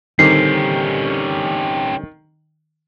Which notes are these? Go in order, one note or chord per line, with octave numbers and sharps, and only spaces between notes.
D3 D#3 G3 C4 C#4 G4 C7